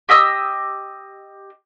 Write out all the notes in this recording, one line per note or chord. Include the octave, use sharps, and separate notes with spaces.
G4 D#5 D#6 E6